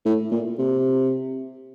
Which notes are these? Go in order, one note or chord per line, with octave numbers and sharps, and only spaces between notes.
A2
A#2
C3